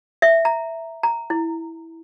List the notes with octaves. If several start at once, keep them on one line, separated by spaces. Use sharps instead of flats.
E5
A#5
A#5
E4